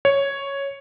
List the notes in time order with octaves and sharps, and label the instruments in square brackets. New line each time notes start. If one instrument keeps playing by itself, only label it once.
[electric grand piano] C#5